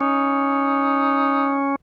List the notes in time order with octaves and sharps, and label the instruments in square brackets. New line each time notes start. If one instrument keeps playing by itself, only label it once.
[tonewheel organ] C#4 [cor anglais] D#4